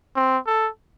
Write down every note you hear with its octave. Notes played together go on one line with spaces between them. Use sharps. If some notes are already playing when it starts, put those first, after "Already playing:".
C4
A4